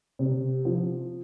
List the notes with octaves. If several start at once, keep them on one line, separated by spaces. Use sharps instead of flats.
C3
F3